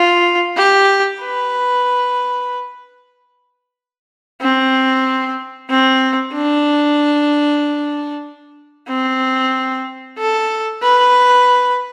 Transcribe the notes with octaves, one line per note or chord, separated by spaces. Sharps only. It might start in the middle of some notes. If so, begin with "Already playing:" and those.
Already playing: F4
G4
B4
C4
C4
D4
C4
A4
B4